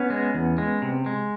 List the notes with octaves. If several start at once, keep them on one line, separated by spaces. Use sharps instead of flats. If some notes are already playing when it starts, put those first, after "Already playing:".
Already playing: B3 C#4
G#3
E2
G#3
C3
G#3